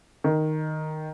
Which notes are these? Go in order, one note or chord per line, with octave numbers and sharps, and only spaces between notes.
D#3